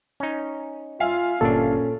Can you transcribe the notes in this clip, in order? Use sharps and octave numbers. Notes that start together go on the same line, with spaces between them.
C#4 D#4
F4 E5 F5 G#5
G1 A#2 C#4 D4 A4